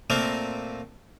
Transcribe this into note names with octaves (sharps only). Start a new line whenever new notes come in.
A#2 A3 A#3 C4 A#4